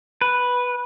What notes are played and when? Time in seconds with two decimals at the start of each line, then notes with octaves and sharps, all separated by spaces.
0.21 B4